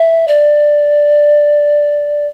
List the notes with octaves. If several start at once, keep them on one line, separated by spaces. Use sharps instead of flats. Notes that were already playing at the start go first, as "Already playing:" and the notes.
Already playing: E5
D5